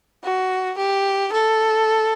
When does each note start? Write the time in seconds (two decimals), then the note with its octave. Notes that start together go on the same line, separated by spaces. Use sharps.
0.24 F#4
0.78 G4
1.32 A4